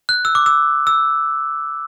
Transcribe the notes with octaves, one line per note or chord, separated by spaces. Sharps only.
F#6
E6
D6
E6
E6